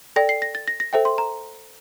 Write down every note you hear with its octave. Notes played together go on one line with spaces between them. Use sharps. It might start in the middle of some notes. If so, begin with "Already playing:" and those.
A4 D5 G5 A#6
C7
A#6
A6
A#6
A#6
A4 C5 E5 G5
C6
A#5